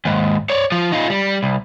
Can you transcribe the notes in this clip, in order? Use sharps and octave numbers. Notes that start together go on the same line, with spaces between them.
D#2 G#2
C#5 D5
F3 F4
D#4 F4
G3
C2